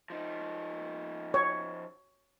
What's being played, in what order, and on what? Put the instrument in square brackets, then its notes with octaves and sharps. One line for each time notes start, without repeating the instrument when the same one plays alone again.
[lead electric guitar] F3 D#4
[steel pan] C#5